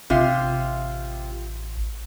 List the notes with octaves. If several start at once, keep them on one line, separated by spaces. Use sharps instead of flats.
A1 C3 F4